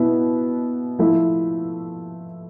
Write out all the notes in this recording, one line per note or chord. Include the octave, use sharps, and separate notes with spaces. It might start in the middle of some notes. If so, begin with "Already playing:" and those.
Already playing: B2 B3 E4
F3 A3 E4